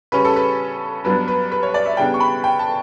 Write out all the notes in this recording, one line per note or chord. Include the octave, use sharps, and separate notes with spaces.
C#3 G3 C#4 B4
A4
B4
G2 F#3 B3 D4 B4
B4
B4
C#5
D5
E5
C#3 G3 B3 D4 G5
C#6
B5
G5
A5